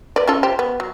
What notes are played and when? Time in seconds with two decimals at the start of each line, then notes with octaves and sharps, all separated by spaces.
0.16 B4 D5
0.27 C#4 F4 A4
0.43 G4 C5
0.59 B3
0.80 F#3